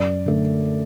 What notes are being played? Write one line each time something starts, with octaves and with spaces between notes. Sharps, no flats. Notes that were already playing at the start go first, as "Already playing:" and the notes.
Already playing: F#2 D5
D3 A3